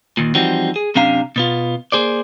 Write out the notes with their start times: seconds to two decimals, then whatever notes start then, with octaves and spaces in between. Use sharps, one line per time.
0.17 D#2 A#2
0.35 E3 F3 G3 C4 D#4 F#4
0.76 G#4
0.95 F#2 C3 C#4 D4 F5 A#5
1.36 B2 B3 F4
1.92 A#3 G#4 C5 D5